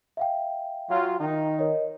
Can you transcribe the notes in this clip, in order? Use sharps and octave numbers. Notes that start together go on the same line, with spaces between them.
E5 F5 G5
F#3 F4
D#3 D#4
A#4 C#5 D#5